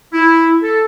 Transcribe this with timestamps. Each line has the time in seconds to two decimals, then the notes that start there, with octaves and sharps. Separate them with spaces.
0.13 E4
0.63 A4